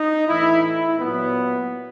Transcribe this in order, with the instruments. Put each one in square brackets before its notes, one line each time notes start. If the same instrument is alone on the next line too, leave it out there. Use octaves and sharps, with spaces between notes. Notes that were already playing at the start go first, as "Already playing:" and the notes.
Already playing: [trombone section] D#4
A2 E3 E4
E4
A#2 F#3 B3